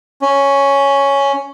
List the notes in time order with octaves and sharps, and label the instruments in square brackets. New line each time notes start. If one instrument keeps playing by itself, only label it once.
[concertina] C#4